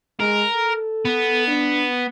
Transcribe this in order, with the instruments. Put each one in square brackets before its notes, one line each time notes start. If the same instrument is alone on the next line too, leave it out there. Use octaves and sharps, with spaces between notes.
[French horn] G#3 [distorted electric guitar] A#4
[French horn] A4
[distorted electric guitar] B3
[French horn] D4